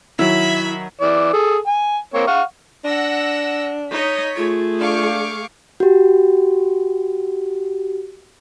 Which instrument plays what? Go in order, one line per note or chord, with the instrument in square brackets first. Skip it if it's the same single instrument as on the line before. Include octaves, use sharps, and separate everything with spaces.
[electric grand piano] D#3 F#3 [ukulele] E4 [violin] E5 B5
[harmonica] E3 D5
G#4 A4
G#5
A#3 C4 C#5
F5 F#5 C#6
[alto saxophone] D4 [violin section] F#5 E6 A#6
[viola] D#4 D#5 [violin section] C#5 B6
[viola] A3 G#4 [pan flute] F4
[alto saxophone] D4 [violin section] F5 C#6 D6
[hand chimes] F#4 G4